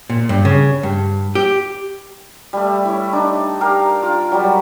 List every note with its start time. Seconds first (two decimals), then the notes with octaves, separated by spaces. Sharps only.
0.10 A#2
0.29 G2
0.45 C#3
0.83 G2
1.35 G4
2.53 G3 A3
2.85 E4 C#5
3.13 D4 D#4
3.61 G4 A#4 F5 A#5
4.03 F4
4.32 F#3 G3